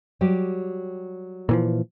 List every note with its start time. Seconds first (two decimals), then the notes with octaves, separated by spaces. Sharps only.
0.21 F#3 G3 G4
1.49 A#2 E3 F3